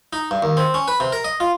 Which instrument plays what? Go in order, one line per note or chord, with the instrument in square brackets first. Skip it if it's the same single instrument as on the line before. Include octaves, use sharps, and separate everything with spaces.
[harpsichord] D#4
G2
D#2
C4
C#4
B4
C3
A#4
D#5
F4